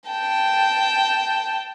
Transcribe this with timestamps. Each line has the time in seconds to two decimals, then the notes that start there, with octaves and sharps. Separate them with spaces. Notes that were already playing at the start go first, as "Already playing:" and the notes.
0.10 G5 A5